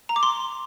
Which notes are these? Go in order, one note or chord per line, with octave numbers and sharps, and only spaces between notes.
A#5
D6
C6